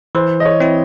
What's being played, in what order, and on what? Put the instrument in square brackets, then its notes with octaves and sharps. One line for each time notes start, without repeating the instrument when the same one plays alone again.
[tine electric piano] E3 [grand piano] C5
[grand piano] D#5
C#5
[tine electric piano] C4 E4